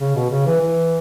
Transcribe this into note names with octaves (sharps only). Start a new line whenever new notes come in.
C#3
B2
C#3
E3
E3